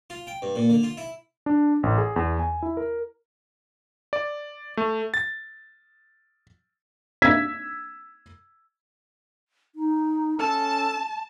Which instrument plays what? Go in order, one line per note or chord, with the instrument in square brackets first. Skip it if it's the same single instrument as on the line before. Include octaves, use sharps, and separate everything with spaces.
[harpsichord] F4
G5
G2
A#2
D3
F4
E4
[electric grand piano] D4
A1
G#4
E2
G#5
E4
A#4
D5
A3
A6
[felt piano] E6 G#6 B6
[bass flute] D#4
[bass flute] C#4 [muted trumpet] A4 [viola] A5